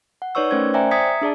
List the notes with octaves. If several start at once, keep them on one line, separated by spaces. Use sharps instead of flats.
F#5
D#4 B4 C#5 D5 C#6 E6
A3 C#4 A#4 C5 G#6
C5 D5 E5 G5 G#5 A#5
E5 A#5 D#6 G#6 B6 C#7
D4 G#4 D5 A5